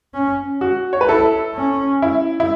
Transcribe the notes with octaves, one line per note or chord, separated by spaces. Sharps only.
C#4
F#4
C#5
B4
E4 A4
C#4
E4
E4